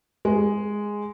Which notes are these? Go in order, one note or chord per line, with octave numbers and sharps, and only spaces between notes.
G#3